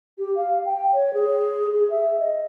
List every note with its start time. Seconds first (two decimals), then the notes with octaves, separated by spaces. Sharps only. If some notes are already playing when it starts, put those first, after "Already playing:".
0.18 G4
0.36 F5
0.65 G5
0.94 C#5
1.14 G#4
1.73 G#4
1.90 E5
2.20 D#5